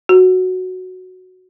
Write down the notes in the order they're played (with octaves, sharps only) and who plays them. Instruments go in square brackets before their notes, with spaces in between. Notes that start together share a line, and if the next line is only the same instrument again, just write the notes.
[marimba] F#4